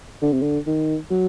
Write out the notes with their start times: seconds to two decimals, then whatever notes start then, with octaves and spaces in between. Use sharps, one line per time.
0.22 D3
0.32 C3
0.42 D3
0.67 D#3
1.10 F#3